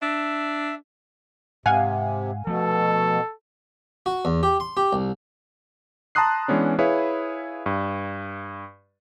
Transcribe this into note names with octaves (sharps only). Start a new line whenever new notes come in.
D4 E5
G#2 C3 F5 F#5 G#5
B2 F3 A3 A4
F#4
E2
G4
C6
G4
C2
A5 A#5 C6 D#6 F#6 C7
E3 G#3 B3 C#4 D4
E4 G#4 B4 C#5 F5
G2